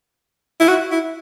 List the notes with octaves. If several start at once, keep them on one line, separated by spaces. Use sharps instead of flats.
E4
F#4
E4